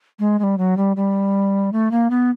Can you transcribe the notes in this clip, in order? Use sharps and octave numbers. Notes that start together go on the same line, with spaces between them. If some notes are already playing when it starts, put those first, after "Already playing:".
G#3
G#3
G3
F#3
G3
G3
A3
A#3
B3